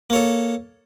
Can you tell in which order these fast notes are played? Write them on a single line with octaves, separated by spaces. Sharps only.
A#3 C#5 A4